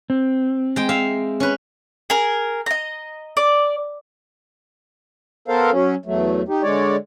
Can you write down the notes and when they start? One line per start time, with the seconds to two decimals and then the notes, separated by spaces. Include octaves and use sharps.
0.10 C4
0.76 G#3 G5
0.89 E5 F5
1.40 C#4 B4
2.10 G#4 A#4
2.66 D#5 A#5
3.37 D5
5.48 B3 A4 A#4 C5 F5
5.71 F#3 C#4
6.06 E2 F#3 A3
6.48 D#4 G4
6.63 D3 G#3 C#5 D5